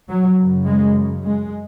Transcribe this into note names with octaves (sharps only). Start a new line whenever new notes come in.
F#3
F#2 C#3
G#3
G#3